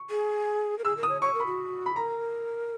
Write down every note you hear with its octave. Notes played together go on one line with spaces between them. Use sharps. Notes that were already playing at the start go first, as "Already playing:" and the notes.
Already playing: C#6
G#4
A#4
G#4 E6
A#4
D#6
C#5
C#5 C#6
A#4
B5
F#4
B5
A#4 A#5